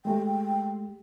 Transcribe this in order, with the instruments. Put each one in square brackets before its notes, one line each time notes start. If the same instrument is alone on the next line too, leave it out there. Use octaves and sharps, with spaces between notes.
[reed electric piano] G#3 A3 G4 [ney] G5